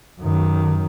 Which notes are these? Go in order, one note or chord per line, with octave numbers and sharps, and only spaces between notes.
F#2 D#3